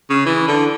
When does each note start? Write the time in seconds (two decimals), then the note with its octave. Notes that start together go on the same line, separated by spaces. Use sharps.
0.10 C#3
0.26 E3
0.47 D3